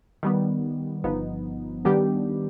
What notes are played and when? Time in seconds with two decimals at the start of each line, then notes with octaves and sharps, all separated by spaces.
0.23 D#3 G3 B3
1.04 G1 G2 F3 B3 D#4
1.85 D#3 G3 B3 D4 G4